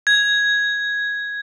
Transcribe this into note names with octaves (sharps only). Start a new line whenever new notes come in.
G#6